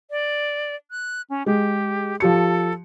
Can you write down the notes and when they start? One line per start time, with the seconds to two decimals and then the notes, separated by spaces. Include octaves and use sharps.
0.11 D5
0.91 F#6
1.30 C#4
1.46 G#3 G4
2.20 F3 G4 A4 C#7